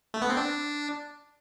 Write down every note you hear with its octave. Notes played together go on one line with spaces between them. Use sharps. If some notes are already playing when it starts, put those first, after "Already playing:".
A3
B3
C4
D4